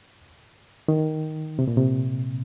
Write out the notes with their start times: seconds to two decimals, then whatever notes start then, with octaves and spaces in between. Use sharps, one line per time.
0.88 D#3
1.59 C3
1.68 A#2
1.77 C3